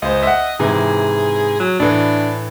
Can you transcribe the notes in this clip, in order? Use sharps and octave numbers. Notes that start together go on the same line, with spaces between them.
C#2 C5 D#5
E5 F#5
G#2 C3 E3 G#4
F#3
A2 E3 D4